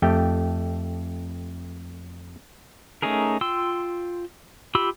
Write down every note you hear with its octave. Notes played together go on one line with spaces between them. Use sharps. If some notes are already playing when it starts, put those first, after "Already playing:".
F2 A3 G4 G5
A3 C#4 D#4 G#4 A#4
F4 G5 C6 E6
F4 G4 B5 E6